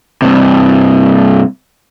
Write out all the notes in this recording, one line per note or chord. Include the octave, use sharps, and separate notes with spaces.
G2 C3